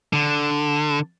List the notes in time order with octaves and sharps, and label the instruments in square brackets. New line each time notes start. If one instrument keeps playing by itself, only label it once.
[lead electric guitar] D3